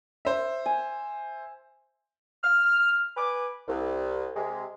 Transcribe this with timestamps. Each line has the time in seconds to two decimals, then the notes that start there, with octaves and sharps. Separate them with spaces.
0.25 C5 E5
0.66 G#5
2.44 F6
3.17 B4 G#5 D6
3.68 C2
4.35 C3 G#3